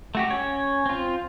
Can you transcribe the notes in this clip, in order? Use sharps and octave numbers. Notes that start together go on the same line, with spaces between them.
A3 F#4 G4
C#4 C#5
C4 F4